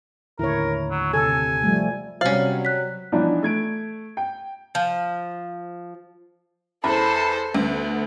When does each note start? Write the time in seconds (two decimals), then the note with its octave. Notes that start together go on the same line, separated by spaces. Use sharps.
0.39 D#2 A2 D3 E4 A#4 C#5
0.91 F#3
1.14 C3 A4 G#5
1.63 F3 G3 A3
2.21 C3 F#3 G3 C#4 C5 F5 A6 F#7
2.65 F#6 B6
3.12 E3 F3 B3 D4 D#4
3.43 A3 G#6 D7
4.17 G5
4.75 F3
6.84 E2 E3 A4 C5 B5
7.55 D2 B3